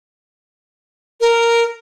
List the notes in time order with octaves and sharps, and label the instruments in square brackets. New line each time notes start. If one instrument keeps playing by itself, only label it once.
[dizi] A#4